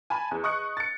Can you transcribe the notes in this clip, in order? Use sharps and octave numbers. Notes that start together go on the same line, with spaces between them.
G#5 A5 B5
E2
D#5 C#6 D#6 F#6 C#7
A6 C#7